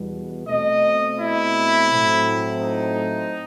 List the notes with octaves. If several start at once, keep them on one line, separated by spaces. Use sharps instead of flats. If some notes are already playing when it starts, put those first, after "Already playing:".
Already playing: E2 B2 G3
B2 A3 C4 D#5
E4
A2 F#3 A3 C4
D#4